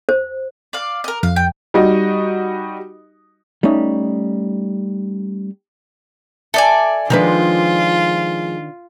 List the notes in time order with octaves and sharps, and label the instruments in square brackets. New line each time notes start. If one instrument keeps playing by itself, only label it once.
[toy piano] C5
[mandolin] D5 F5
A#4 D#5
[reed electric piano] F2 [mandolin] F5
[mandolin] G5
[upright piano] G3 D#4 F#4 D#5
[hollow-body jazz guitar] G3 A3 C#4 D#4
[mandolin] A4 D5 G#5 [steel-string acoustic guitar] E5
[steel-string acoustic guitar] D#3 D4 [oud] F3 G#3 B4 [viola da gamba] F4